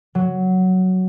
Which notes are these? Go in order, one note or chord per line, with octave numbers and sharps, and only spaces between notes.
F#3